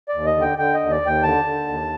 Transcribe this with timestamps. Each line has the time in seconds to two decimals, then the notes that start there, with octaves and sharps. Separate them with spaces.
0.09 D5
0.15 D#2
0.26 D#5
0.37 D3
0.42 G5
0.58 D3 G5
0.74 D#5
0.80 D#2
0.91 D5
1.02 D#2 G5
1.23 D3 A5
1.45 D3
1.68 D#2